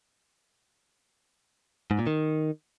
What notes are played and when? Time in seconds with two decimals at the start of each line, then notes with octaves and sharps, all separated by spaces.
1.91 G#2
1.99 A#2
2.07 D#3